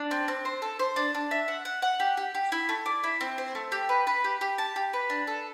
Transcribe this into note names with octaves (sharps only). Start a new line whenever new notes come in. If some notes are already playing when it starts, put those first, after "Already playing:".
Already playing: D4
C4
C4
C5
A4
C5
D4
D4
E5
F#5
F#5
F#5
G4
G4
G4
E4
A3
D5
E4
C4
C5
A3
G4
B4
B4
G4
G4
A5
G4
B4
D4
A4